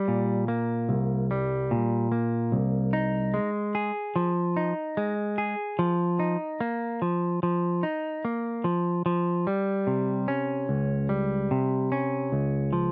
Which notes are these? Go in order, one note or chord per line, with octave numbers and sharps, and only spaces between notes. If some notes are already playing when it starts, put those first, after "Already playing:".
Already playing: G3
A#2
A#3
C2
G3
A#2
A#3
C2
D#4
G#3
G#4
F3
D#4
G#3
G#4
F3
D#4
A#3
F3
F3
D#4
A#3
F3
F3
G3
C3
C#4
C#2
G3
C3
C#4
C#2
F3